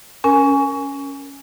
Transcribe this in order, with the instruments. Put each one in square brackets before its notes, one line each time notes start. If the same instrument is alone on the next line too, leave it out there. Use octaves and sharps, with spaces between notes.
[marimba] C#4 A#4 G#5